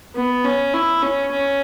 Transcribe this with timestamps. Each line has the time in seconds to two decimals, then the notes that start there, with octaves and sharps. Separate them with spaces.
0.15 B3
0.44 C#4
0.73 E4
1.02 C#4
1.31 C#4